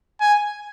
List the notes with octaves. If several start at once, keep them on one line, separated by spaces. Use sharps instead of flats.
G#5